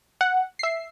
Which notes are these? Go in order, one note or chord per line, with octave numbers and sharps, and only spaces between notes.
F#5
E5 C7